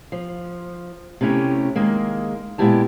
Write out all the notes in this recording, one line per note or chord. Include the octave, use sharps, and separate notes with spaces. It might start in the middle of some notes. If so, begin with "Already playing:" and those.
F3
C3 A3 C#4 E4 G4
D#3 G#3 A#3
A#2 G#3 B3 E4 G4 A5